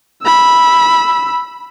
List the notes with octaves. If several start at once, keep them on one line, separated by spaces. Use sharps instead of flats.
B5 E6